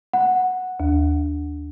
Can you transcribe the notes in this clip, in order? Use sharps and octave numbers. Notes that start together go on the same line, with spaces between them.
F#5
D#2